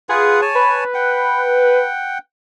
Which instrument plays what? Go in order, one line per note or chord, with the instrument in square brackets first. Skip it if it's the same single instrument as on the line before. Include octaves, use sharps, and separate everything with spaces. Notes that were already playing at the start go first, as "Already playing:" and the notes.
[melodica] F4 B4 F#5 [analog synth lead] G#4
[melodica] C#5 G#5 A5
[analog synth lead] B4
[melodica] F#5 G5